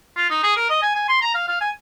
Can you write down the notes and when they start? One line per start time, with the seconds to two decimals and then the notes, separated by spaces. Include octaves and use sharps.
0.17 F4
0.30 D#4
0.43 G#4
0.56 A#4
0.70 D#5
0.82 G#5
0.95 G#5
1.09 C6
1.22 A#5
1.34 F5
1.48 F5
1.61 G#5